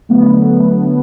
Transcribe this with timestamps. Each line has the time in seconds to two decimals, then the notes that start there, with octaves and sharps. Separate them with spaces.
0.09 D3 F#3 A3 B3